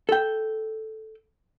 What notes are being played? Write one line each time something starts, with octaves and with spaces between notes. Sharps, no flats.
A4 G5